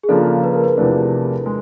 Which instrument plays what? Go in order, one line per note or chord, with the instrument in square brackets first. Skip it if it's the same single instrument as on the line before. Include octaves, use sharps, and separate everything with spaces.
[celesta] G#4
[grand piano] C#3 F3 A#3 D4 [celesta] A4
[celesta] B4
A#4
B4
[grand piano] E2 C3 F3 A3 D4
G#3